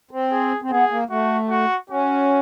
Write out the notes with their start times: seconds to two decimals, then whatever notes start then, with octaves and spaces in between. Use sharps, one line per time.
0.11 C4
0.32 G#4
0.62 C4
0.71 B3 G#4
0.90 A#3
1.10 A3 F#4
1.50 F#4
1.90 C#4 F#4